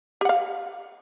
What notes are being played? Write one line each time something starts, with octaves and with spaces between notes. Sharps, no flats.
G4 F5 F#5